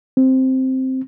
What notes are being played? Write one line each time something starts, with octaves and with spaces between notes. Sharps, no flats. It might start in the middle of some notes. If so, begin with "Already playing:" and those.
C4